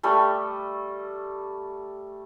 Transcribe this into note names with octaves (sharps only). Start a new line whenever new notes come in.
G3 A3